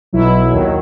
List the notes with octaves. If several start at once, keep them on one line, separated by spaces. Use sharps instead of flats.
B1 B2 F#3 E4
D#2 D#3 F#3